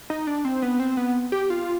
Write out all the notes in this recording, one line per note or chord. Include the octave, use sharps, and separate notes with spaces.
D#4
D4
C4
B3
C4
B3
G4
F4